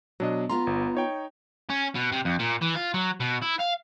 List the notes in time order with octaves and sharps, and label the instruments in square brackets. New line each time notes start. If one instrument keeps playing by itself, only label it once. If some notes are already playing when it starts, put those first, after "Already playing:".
[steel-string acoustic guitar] B2 [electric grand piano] F#3 D4 D#5
[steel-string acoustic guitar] B3 F4 A#5 [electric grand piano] C6
[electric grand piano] G1
D#4 C#5 G5
[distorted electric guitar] C#4
B2
C3
F2
A#2
E3
F4
F#3
B2
E4
F5